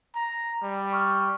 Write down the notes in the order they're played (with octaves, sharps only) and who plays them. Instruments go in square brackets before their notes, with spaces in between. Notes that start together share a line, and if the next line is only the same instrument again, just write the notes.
[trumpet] A#5
G3
[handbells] C#6 D#6 F6